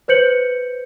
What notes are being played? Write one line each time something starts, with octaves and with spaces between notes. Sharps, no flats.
B4 C5 G6 C#7 F#7